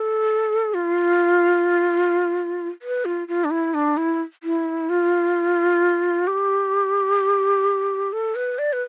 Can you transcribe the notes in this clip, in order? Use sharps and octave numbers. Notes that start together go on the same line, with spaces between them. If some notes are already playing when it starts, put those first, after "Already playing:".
Already playing: A4
F4
B4
F4
F4
D4
E4
D4
E4
E4
F4
G4
A4
B4
D5
B4